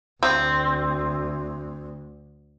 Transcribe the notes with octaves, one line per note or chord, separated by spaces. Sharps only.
D2 C4